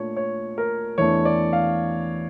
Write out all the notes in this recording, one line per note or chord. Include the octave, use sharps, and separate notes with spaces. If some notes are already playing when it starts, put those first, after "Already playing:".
Already playing: A#2 A3 D4 C#5
C#5
A#4
E2 E3 A3 D4 C#5
D5
F5